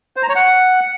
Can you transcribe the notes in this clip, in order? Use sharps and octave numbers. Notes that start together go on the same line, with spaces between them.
C5
A#5
C#5
F#5